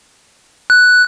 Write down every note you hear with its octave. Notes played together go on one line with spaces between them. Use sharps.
F#6